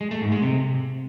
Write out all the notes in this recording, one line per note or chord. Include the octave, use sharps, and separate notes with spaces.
G#3
A3
G#2
G#3
C3